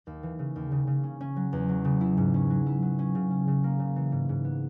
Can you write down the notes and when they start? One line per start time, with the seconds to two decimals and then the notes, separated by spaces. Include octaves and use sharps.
0.07 D#2
0.23 E3
0.39 C#3
0.56 D#2
0.72 C#3
0.87 C#3
1.03 C#4
1.21 C#4
1.36 F#3
1.53 E2
1.69 F#3
1.85 C#3
2.01 E4
2.17 G#2
2.34 C#4
2.50 F#3
2.66 E4
2.82 F#3
2.99 C#4
3.15 C#3
3.31 C#4
3.48 C#3
3.64 A#3
3.79 C#3
3.96 E3
4.12 G#2
4.29 G#2
4.44 B3